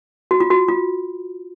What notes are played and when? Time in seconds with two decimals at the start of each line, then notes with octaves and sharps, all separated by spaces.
0.31 F#4
0.40 F4
0.50 F#4
0.68 F4